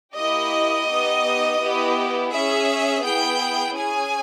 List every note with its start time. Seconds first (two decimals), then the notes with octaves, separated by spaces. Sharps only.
0.15 A#3 E4 G4 D#5
0.87 B3 D#4 G4
1.59 B3 E4 G4
2.31 C#4 G#4 E5
3.04 B3 E4 G#4 G5
3.76 C#4 G#4 G#5